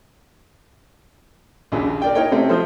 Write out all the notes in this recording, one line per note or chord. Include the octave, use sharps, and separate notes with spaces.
A#1 D#2 A#2 C#3
A#4 D5 G5
D#4 E4 A#4 C#5 G5
C3 A3 C4 C#4
F3 A3 C5